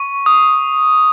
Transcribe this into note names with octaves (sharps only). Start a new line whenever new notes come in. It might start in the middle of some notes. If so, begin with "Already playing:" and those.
Already playing: C#6
D#6